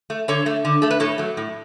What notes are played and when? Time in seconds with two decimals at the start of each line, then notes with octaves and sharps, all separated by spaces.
0.10 A3
0.28 D3 A4 C#5
0.46 A3
0.65 D3
0.82 A3 A4
0.91 B4
1.00 A2 A4 C#5
1.18 F#3 A3
1.37 A2